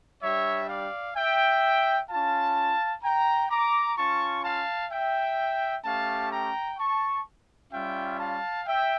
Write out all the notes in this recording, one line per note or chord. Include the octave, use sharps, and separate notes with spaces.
G3 D4 G4 C#5 E5
D5 F5
E5 G5
C#4 F4 F5 A5
G5 A#5
A#5 D6
C#4 F4 A5 C#6
F5 A5
E5 G5
A3 C#4 G4 F5 A5
G5 A#5
A5 C#6
G3 C#4 F4 E5 G5
F5 A5
E5 G5